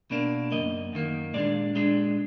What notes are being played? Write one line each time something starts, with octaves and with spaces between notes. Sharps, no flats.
B2 A#3 D4
F#2 D#3 A#3 D#5
F#2 D#3 A#3
A#2 G#3 D4 D5
A#2 G#3 D4